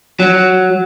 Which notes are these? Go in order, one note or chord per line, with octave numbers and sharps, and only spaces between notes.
F#3